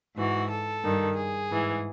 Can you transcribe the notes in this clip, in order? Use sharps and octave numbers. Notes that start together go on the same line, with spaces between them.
G#2 E3 F#4
A4
G2 D#3
G#4
G#2 E3